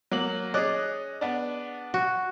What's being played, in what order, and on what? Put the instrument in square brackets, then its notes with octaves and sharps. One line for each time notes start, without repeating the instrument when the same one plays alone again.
[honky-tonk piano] F#3 A#3 F#7
[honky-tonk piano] C#4 D#5 F#6 [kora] G#4 D5
[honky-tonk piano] B3 D4
[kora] F#4